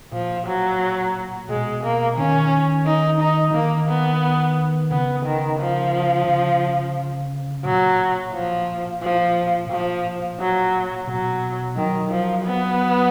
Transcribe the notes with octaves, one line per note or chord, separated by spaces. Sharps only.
A#2 F3
F#3
B2 G#3
A#3
D#3 C#4
D#4
D#4
D#3 A#3
B3
C#3 B3
D#3
F3
C#3
A#2 F#3
F3
F3
A#2 F3
F#3
B2 F#3
D#3 F#3
F3
B3